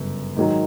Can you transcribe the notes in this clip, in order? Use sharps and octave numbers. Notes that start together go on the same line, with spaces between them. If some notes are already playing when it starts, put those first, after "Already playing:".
Already playing: G1 F#2 C#3
G#2 D#3 F#3